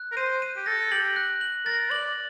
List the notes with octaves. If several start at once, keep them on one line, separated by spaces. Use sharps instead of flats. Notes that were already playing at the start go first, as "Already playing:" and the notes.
Already playing: F#6
A#4
C5 D#7
D#7
G4
A4 A#6
G4 F#7
F#6
F#7
A#4 A6
D5 F#7